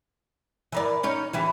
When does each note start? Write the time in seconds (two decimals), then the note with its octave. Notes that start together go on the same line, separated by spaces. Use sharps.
0.72 E3 A#4 D5
1.03 C#4 D#4 C#5
1.33 E3 E4 G4